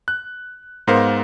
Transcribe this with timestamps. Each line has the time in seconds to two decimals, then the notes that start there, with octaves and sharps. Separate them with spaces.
0.08 F#6
0.87 G#2 B3 A#4 C5 F5